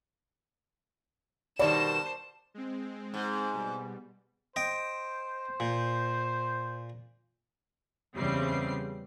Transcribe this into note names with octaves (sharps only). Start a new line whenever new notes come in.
B2 D#3 G3 C5 D5 A5 E7
G#3 C4
G#2
B2 G3
C5 D#5 G5
A#2
E2 C#3 G3 C4 C7